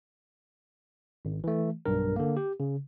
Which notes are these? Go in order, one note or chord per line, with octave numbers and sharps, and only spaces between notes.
G#1
E3 A3
B1 G2 A#4
D3 A#3
G4
C#3